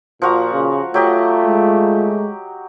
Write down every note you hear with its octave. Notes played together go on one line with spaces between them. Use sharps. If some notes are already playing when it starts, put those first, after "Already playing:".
A#2 F3 F#4 A#5
C#3
F#3 A3 F4 G4 D#5
G#3